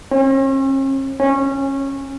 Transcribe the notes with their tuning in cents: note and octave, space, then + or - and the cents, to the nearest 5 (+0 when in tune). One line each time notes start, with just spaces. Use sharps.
C#4 -45
C#4 -20